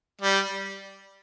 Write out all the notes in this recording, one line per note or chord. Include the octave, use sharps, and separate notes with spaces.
G3